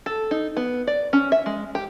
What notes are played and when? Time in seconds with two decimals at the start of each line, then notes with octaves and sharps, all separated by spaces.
0.06 A4
0.31 D#4
0.57 B3
0.87 D5
1.13 C#4
1.32 E5
1.46 G#3
1.75 G4